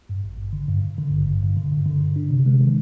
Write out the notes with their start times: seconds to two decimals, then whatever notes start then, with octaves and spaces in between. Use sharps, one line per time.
0.09 G2
0.24 G#1
0.38 G#1
0.53 D3
0.68 G2
0.83 G2
0.98 D3
1.12 G#1
1.27 G2
1.43 G2
1.57 D3
1.72 G2
1.86 D3
2.01 D3
2.16 D4
2.31 C3
2.46 G#3
2.60 D#3